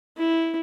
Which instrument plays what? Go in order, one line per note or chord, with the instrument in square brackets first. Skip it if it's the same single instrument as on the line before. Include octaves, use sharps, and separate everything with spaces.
[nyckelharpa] E4